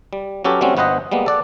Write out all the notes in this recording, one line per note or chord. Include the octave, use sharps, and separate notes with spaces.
G3
F#3 C#4 G4 A4 B4
F#3 G3 A3 C4 C#4 F#4
G1 B3 B4 C5 D#5 F#5
G3 G#3 A#3 B3
A4 D5 F#5